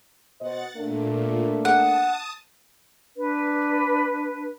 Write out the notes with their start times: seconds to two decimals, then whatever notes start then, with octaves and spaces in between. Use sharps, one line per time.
0.41 B2 C5 D#5 F#5 A6
0.77 A#2 A3 A#3 D4
1.65 F#5 A5 D#6
3.16 D4 B4